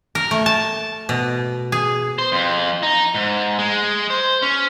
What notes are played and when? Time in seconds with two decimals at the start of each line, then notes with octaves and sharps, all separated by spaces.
0.15 A#4
0.31 A3
0.46 A5
1.09 B2
1.72 G#4
2.18 C5
2.32 F2
2.83 D#4
3.14 G#2
3.59 G#3
4.10 C5
4.42 C#4